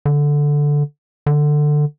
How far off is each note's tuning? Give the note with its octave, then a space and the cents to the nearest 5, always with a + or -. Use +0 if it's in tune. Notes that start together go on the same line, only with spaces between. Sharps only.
D3 -5
D3 +15